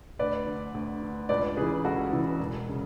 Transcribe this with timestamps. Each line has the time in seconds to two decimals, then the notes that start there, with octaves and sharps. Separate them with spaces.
0.19 D2 B4 D5
0.47 D3
0.74 D2
1.03 D3
1.29 C#2 B4 D5
1.57 C#3 E3 G#4 B4
1.84 C#2 F#4 A4
2.13 C#3 E3
2.39 E1
2.69 C#3